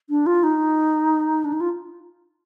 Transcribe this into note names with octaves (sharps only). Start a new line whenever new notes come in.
D4
F4
D#4
D4
D#4
F4